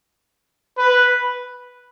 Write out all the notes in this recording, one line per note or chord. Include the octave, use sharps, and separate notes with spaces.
B4